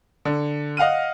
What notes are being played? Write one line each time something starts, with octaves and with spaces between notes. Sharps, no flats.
D3
D#5 F5 F#5 F6 D#7